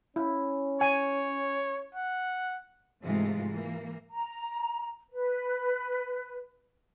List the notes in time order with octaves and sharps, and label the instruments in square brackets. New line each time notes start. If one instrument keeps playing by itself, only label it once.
[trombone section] C#4 [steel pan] E4
[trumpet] C#5 [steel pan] G#5
[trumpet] F#5
[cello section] G#2 C3 E3 G#3 A3 F4
E3 A#3
[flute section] A#5
B4